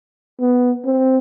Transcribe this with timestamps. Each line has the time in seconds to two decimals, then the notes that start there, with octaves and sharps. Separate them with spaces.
0.39 B3
0.85 C4